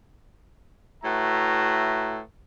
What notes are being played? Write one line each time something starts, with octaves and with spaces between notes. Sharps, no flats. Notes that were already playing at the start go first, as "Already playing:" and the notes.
A2 F#4 B4 E5 A#5